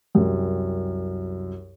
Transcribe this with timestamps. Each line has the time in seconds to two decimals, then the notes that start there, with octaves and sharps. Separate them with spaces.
0.14 C2 F#2 C3